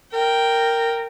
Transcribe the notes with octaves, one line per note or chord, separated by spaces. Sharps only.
A#4 G5